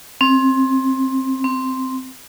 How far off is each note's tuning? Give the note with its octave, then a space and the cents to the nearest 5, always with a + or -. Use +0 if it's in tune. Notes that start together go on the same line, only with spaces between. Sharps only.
C4 +15
C4 -5